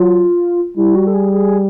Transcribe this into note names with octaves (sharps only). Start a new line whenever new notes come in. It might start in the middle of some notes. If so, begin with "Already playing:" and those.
Already playing: F#3 F4
G3 E4
F#4
A4
G#4
G#4